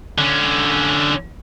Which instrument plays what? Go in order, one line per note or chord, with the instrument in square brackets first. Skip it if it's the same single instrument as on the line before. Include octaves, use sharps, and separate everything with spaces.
[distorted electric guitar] D3 C#4